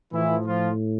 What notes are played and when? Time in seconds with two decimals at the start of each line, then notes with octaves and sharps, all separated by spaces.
0.12 A2 E3 F3 E4
0.46 F3 F4